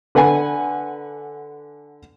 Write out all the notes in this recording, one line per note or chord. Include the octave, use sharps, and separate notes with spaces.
D3 B4 F#5 G#5